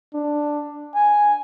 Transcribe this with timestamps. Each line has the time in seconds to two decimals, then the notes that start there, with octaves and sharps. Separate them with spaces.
0.14 D4
0.95 G#5